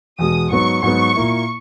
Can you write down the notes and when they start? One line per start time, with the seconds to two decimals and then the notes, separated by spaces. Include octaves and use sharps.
0.19 E2 B2 G#3 D#6
0.51 G#2 F#3 B3 C#6
0.83 G#2 F#3 B3 C#6
1.15 A#2 A#3 E4